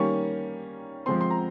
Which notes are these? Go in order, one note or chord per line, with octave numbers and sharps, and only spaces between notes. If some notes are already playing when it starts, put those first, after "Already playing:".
Already playing: D#3 G3 A#3 C#4 C#6
F3 G#3 C4 C6
C6
A#5